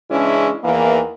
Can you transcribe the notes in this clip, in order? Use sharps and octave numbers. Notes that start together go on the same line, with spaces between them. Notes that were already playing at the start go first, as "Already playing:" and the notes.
C#3 E3 G#3 C#4 D4 E4
E2 D#3 E3 A#3